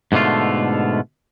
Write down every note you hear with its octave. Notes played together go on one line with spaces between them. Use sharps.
G#2 B2 D3 A3 F4